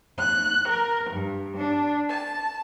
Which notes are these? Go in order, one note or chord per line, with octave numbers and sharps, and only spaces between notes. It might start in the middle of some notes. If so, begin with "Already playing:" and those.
F#6
A#4
G2
D4
A5